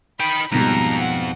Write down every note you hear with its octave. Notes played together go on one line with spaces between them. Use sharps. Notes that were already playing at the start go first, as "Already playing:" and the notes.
D#4 G5 B5
F2 G#2 B2 G3 A#5
F#5